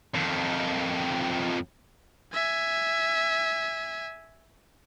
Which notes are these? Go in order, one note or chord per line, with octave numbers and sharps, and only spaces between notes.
F2 D#3
E5 G#5